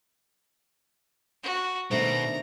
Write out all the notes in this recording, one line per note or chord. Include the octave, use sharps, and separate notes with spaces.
F#4
B2 D#3 A3 D4 C5 A#5